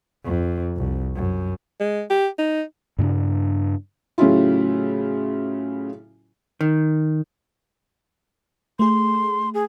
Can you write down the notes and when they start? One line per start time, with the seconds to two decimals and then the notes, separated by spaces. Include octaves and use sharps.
0.25 F2
0.76 C2
1.15 F#2
1.80 G#3
2.10 G4
2.39 D#4
2.99 G2 C#3 C4 D4
4.18 A2 C#3 F#3 C#4 E4 F4
6.61 D#3
8.79 A3 G#4 C6
9.54 G#4